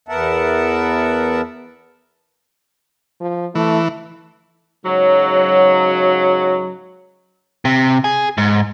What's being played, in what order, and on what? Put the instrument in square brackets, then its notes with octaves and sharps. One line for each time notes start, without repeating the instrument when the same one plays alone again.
[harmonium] E2 B3 A#4 E5 F#5 A5
[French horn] F3
[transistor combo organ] E3 [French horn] A3
[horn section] G#2 C#3 F#3
[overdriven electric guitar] C3
G#4
G#2